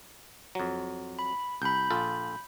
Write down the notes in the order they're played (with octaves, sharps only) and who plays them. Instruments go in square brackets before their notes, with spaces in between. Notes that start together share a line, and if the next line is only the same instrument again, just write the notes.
[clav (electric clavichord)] F2 F#3
[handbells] B5
[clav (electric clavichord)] C2 [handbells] B5 G6
[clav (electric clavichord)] A#1 F4 A4